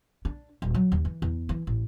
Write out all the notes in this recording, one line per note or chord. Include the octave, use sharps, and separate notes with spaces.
D4
D#1
F#3
D#2
E3
E2
E3
A1